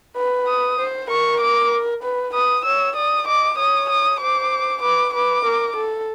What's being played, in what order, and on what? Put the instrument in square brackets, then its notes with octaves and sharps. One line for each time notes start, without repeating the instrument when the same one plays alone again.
[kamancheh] B4
[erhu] D#6
[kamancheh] C5
[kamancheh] A#4 [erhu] C#6
[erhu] D6
[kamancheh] B4
[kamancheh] B4 [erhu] D#6
[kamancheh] C#5 [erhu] E6
[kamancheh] D5 [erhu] D#6
[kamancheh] D#5 [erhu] D6
[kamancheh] C#5 [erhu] D#6
[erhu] D#6
[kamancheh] C5 [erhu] D6
[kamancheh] B4 [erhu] D6
[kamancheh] B4 [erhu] D6
[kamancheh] A#4
A4